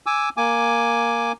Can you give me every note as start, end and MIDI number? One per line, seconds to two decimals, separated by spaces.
0.06 0.29 80
0.06 0.29 86
0.06 0.29 88
0.37 1.32 58
0.37 1.32 80
0.37 1.32 86